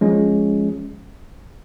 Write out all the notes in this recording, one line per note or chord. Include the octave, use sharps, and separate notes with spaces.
F3 G#3 C#4